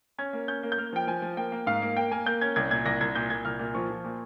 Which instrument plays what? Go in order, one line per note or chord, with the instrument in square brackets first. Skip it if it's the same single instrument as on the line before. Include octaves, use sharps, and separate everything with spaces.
[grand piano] C#4 G#6
A#3
C#4 G6
A#3
G6
A#3 F6
F3 G5
F3 G#5
F3
A#3 G5
A#3
G#2 F5
A#3
A#3 G5
A#3 G#5
A#3 G6
C#4 G#6
C2 G#6
A#2 G#6
C2 A#6
C2 G#6
A#2 G6
A#2 G#6
C2 F6
A#2
F3 C#6
F3
A#2